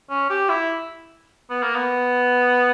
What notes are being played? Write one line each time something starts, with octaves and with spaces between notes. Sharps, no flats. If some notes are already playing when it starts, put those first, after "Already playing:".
C#4
G4
E4
B3
A#3
B3